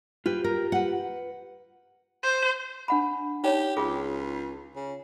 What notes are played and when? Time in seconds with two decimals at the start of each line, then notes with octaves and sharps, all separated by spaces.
0.26 F4 G4 B4
0.44 A#4
0.72 B4 F#5
2.23 C5
2.88 D4 F#5 B5
3.44 D#4 G4 C#5
3.77 C#2 F4 G#4 D#6
4.76 C#3